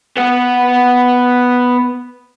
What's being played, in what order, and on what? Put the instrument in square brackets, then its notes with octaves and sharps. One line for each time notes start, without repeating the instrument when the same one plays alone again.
[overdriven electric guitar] B3 F#5